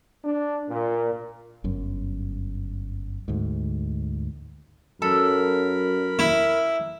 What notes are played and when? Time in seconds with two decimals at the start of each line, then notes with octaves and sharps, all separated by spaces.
0.24 D4
0.69 A#2
1.64 G1 F#2
3.28 D2 G#2
5.02 F#2 A4 A#4 B5
6.19 E4